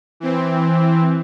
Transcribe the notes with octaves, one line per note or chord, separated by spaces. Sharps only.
E3 C4